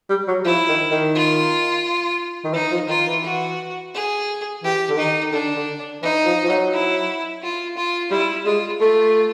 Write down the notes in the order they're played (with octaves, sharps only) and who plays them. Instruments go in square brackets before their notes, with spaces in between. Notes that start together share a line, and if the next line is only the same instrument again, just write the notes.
[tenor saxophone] G3
F#3
[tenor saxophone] F3 [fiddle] E4
[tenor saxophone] D#3
D#3
[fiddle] F4
[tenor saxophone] D#3
[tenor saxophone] E3 [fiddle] D#4
[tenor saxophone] F3
[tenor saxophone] D#3 [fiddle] F4
[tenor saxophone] E3
[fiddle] F#4
G#4
[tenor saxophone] E3 [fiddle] G4
[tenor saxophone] D3
[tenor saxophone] D#3 [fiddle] D#4
[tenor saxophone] D3 [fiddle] D4
[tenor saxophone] D3
[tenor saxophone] E3 [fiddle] D#4
[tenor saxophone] F3
F3
F#3
[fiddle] E4
F4
F4
[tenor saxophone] G3 [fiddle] E4
[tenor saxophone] G#3 [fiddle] F4
[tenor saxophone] A3 [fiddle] F4